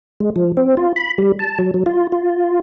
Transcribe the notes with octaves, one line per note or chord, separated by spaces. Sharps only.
G#3
F3
C4
F4
B5
G3
A5
F#3
F#3
F4
F4